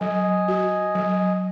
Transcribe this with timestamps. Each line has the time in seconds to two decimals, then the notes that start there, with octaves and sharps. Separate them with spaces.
0.01 F#3 D#5 G#5
0.48 F#4
0.95 F#3